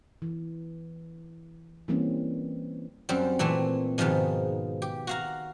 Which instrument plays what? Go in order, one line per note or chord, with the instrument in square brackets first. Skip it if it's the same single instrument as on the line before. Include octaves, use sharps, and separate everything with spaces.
[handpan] E3
E3 G3 A#3 C4 C#4
[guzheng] F#2 G3 C4
A#2 E3 A3 C4
G#2 B2 D#3 F3 G#3
G4
F#4 F5 A#5